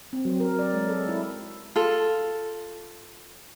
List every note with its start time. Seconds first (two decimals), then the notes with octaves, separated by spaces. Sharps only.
0.13 C4
0.25 F#3
0.40 A#4
0.59 D5
0.74 G#3
0.89 A4
1.09 E4
1.76 F4 A4